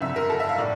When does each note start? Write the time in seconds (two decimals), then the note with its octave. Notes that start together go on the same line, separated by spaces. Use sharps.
0.01 G1 F2 D3 E5
0.16 A#4
0.30 A4
0.40 E5
0.49 F5
0.58 A2 D5